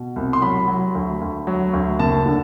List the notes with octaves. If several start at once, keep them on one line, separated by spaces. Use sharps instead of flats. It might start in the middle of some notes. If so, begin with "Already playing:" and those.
Already playing: B2
C2
C6
F#3 B5
F#3
D2
D2
F#3
D2
F#1 A5
D3